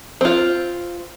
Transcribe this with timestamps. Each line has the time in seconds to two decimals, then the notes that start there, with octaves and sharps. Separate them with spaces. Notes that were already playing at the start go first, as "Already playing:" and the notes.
0.21 C4 F4